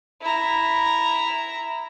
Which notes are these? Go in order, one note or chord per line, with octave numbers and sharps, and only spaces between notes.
E4 A#5